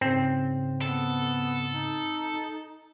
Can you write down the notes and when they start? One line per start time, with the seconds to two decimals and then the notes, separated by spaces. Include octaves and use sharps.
0.01 G#2 C#3 C4
0.81 B3 A4
1.73 D#4